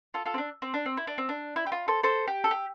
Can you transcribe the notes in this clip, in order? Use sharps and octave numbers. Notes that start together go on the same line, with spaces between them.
F4 A4
F4 A4
C4
D4
C4
D4
C4
E4
D4
C4
D4
E4
G4
F4
A4 C5
A4 C5
G4
A4
G4